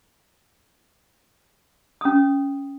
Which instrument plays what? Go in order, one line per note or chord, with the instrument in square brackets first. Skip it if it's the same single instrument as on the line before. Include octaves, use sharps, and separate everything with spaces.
[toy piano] C#4 D#6